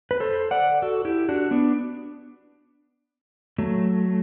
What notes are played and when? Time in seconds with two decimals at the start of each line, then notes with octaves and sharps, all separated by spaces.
0.11 B4
0.20 A4 C5
0.51 D5 F#5
0.82 F#4 A4
1.05 E4 G4
1.29 D4 F#4
1.51 B3 D4
3.58 F#3 A3